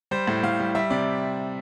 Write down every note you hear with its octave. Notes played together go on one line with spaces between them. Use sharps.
G3 C5
A2
A2 F5
G3
G3 E5
C3 D5